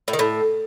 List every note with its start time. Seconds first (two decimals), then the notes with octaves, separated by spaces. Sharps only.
0.08 A2
0.13 D#3
0.19 A2